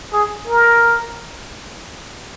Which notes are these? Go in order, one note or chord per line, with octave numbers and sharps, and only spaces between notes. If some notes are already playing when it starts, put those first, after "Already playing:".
G#4
A#4